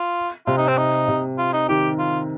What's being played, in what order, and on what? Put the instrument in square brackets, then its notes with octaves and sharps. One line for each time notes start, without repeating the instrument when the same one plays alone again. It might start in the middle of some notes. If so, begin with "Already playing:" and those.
Already playing: [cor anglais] F4
[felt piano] C3 [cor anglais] F4
[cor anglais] D#4
C4
D#4
[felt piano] C3
[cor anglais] F4
D#4
[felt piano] D#3 [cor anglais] G4
[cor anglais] F4